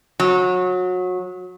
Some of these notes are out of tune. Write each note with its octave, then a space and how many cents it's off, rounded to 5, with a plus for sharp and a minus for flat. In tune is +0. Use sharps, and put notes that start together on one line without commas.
F#3 -25